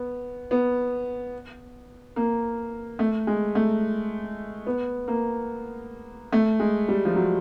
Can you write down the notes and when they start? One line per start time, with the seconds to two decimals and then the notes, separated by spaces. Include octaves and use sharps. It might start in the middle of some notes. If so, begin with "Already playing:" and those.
Already playing: B3
0.51 B3
2.16 A#3
2.99 A3
3.27 G#3
3.55 A3
4.66 B3
5.08 A#3
6.33 A3
6.60 G#3
6.88 G3
7.05 F3
7.15 F#3